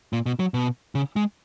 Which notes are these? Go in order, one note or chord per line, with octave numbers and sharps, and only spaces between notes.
A#2
B2
F#3
B2
C#3
G#3